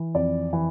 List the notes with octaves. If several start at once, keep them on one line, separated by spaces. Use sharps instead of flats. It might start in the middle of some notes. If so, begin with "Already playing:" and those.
Already playing: E3
F2 D5
E3